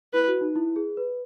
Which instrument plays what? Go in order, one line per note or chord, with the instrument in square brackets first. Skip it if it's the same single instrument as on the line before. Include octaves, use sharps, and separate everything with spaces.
[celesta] E4 [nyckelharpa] B4
[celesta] F#4
D#4
E4
G#4
B4